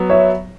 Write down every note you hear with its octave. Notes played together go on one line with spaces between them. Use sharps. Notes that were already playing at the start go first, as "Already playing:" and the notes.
Already playing: F#3 B3
C#5 E5